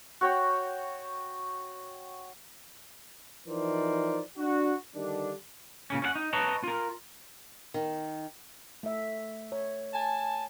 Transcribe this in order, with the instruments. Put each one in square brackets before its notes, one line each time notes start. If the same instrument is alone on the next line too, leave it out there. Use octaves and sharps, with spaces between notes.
[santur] F#4 C#5 G5
[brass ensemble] E3 F3 D#4 A#4 C5 D5
D4 F#4
D3 D#3 G3 D4
[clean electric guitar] A#2 C#3 C#4
C#4 E4 F#5
D#4
B4 C#5 D#5 A5 A#5
F4 A#4
[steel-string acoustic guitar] D#3
[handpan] A3 E5
C#5
[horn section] G#5 A5